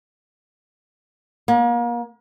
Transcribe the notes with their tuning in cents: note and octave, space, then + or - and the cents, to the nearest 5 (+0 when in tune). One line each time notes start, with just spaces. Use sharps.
A#3 +35